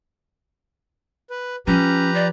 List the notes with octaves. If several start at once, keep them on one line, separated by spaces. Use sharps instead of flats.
B4
F3 C#4 G4 B4 A#5
D5